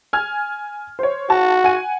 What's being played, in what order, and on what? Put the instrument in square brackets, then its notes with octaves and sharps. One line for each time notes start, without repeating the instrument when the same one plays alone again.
[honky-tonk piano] G#5 F6 G#6
C5 C#5
[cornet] F#4 [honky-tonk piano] A5
[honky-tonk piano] F#5 G#5 D#7